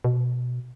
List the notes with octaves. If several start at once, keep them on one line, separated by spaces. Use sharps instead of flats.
B2